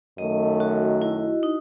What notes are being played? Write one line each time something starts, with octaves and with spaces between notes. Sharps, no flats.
F#2 D#3 A3 D#5
F#4
E4
D#4